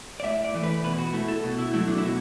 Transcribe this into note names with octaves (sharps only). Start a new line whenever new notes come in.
D5
A2 E5
D5
E3 A3
B4
B2 B4
F#4
A3 E4
A4
B2
E4
F#3 A3 E4
D4
E4
B2 F#4